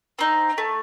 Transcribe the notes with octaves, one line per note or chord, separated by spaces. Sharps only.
C4 D#4
A3